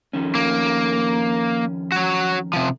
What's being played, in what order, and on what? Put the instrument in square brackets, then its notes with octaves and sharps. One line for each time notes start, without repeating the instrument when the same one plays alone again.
[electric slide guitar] F2 D#3 C#4
[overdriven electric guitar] A#3
F#4 C#5
C3 F3